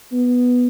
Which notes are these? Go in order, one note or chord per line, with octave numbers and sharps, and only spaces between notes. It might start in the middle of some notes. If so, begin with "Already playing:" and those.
B3